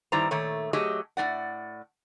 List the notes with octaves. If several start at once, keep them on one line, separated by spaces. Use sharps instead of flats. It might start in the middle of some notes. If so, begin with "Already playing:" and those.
G2 D#3 G3 E4 C5 A#5
A#2 D#3 A3 C#5
F#3 A3 G4 G#4 D#5
A2 C#4 D5 F#5